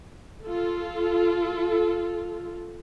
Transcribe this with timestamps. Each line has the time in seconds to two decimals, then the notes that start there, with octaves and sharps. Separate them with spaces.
0.44 F4 A4